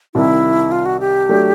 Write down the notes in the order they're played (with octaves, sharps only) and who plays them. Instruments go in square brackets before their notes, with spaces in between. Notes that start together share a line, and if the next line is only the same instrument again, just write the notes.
[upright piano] C2 C3 D#3 [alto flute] E4
[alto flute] F4
F#4
G4
[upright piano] F#3 A3 D4